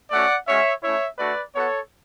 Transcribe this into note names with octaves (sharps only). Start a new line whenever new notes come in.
A3 C#4 F#4 D5 F#5
G#3 C#4 F#4 C#5 E5
A3 C#4 E4 C#5 E5
A3 D4 F#4 B4 D5
B3 F#4 A4 C#5